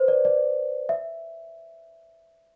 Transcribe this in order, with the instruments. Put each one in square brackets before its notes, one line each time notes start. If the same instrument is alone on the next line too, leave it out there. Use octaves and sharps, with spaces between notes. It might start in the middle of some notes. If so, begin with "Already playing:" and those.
Already playing: [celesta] B4 C5
D5
D5
E5